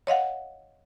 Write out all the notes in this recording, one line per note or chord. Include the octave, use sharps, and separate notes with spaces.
C#5 D#5 F5 F#5